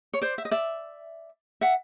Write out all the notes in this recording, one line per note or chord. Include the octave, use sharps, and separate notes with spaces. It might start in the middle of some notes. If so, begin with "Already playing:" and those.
C#5
C5 D5
E5
D#5
D5 E5
E5 F#5